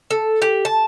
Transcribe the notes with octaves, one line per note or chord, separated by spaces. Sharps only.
A4
G4
A5